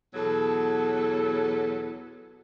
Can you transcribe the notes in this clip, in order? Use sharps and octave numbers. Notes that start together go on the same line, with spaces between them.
E2 B2 F#3 A4